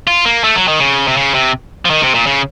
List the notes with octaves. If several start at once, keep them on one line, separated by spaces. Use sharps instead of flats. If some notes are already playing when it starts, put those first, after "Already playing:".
F4
A#3
A3
F#3
D#3
C#3
C3
C#3
C3
F3
D#3
C3
A#2
C#3